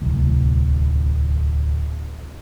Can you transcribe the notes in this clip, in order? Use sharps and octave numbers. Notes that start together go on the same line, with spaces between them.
D1 C2